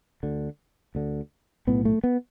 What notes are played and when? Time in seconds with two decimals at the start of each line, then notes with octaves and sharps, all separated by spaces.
0.23 D2 D3
0.95 D2 D3
1.67 B1 A2 B3
1.85 A3
2.04 B3